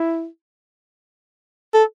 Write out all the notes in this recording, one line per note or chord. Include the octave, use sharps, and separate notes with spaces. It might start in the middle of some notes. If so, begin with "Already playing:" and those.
Already playing: E4
A4